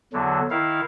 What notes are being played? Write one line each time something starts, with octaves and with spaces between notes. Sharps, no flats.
E2 D3 F#3
D#3 E4 F5